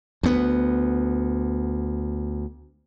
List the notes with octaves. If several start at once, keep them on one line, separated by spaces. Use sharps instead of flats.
D2 B3